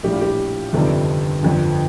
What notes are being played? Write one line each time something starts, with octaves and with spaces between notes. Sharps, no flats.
A#1 A2 G3 G4
F4
G4
G1 F2 C3 D#3 G3 A4
G1 F2 D3